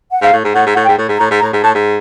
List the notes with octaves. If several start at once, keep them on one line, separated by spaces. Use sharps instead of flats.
F#5
G#2 F5
A2
G#2
A2 F#5
G#2
A2 F#5
G#2 G5
A2
G#2
A#5
A2
G#2
A#5
A2
G#2
A2 A5
G#2